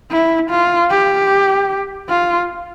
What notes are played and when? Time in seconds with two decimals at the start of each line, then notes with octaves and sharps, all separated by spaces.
0.11 E4
0.50 F4
0.91 G4
2.09 F4